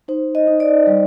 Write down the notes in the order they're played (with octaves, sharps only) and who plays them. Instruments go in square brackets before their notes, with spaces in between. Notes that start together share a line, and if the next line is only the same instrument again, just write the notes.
[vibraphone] D#4 C5
D#5
D#4
D5
G3